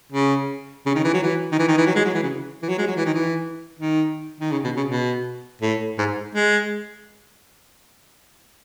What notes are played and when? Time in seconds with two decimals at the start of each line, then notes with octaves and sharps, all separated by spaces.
0.12 C#3
0.86 C#3
0.95 D#3
1.04 E3
1.14 F#3
1.22 E3
1.52 D#3
1.59 E3
1.68 D#3
1.77 E3
1.87 F#3
1.95 G#3
2.05 F#3
2.14 E3
2.23 C#3
2.62 E3
2.69 F#3
2.78 G#3
2.87 F#3
2.96 E3
3.05 D#3
3.15 E3
3.79 D#3
4.40 D#3
4.52 C#3
4.64 B2
4.77 C#3
4.89 B2
5.62 A2
5.98 G#2
6.35 G#3